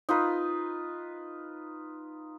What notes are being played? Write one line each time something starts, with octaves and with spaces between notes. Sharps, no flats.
D#4 F4 B4